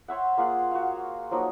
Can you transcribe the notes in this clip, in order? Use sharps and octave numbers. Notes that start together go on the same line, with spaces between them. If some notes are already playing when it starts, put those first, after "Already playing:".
C5 C#5 E5 F#5
A#3 F4 G#4 F#5
F#4 F5
F3 F#3 A#3 D#4